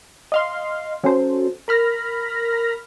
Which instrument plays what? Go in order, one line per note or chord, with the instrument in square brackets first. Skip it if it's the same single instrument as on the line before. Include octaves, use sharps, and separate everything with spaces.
[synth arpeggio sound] D#5 F5 C6
F#3 C#4 A4 C5
A#4 B5 F6 A#6